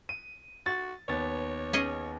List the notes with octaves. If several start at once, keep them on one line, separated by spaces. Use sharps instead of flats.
D#7
F#4 A6
D#2 B3 C#5 A6
C#4 G#4 D#5